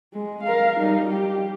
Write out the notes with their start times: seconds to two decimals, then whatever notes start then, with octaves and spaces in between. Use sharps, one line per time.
0.14 G#3
0.43 A#4 F5
0.80 G3 D#4
1.10 G4